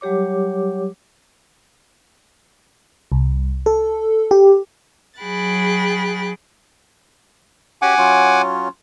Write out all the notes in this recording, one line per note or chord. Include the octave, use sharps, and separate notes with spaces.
F#3 G3 G4 C#5 D6
C2
A4
G4
F#3 G#4 G5 B5 F#6 A6
C#4 F#4 G4 F#5 G#5 D6
F#3 C#4 F4